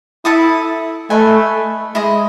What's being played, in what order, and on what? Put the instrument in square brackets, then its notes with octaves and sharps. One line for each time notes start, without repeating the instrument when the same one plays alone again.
[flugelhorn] E4 [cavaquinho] A4 E5 A5 D#6
[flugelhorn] A3 [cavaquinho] B4 D#5 G#5
[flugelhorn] G#3 [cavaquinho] E4 G#4 D#5